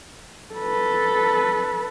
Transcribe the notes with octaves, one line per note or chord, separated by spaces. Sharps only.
A4 B4